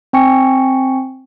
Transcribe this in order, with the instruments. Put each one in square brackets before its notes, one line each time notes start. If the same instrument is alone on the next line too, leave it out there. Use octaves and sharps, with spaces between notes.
[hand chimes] C4 G5 G#5 C#6 C#7